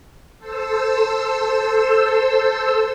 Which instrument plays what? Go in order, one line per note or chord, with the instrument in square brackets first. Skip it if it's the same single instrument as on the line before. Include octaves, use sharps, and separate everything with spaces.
[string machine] A4 C5 E6